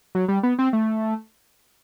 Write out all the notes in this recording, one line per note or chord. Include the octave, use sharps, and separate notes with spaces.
F#3
G3
B3
C4
A3